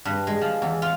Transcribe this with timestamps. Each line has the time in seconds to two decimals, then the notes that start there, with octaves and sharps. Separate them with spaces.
0.05 G2
0.27 G#3
0.41 F3
0.62 E2
0.82 F4